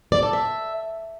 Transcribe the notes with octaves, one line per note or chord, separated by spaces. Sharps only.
D5
A4
E5